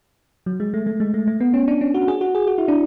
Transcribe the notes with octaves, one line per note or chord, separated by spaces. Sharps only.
F#3
G#3
A3
A3
G#3
A3
A3
B3
C#4
D4
C#4
F#4
G#4
F#4
G#4
F#4
E4
D4